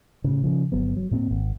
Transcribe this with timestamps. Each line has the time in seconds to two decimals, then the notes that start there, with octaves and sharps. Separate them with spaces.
0.24 A2 C#3
0.43 C#3 F3
0.72 G1 F#3 B3
0.96 F#3
1.11 A2 A#3 C4
1.31 G#1